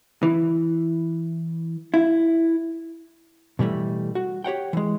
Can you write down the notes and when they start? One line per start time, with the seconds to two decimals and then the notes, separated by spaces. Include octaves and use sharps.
0.23 E3
1.94 E4
3.59 B2 E3 G3 A3
4.15 F#4
4.44 G4 C#5 F#5 G5
4.73 E3 G#3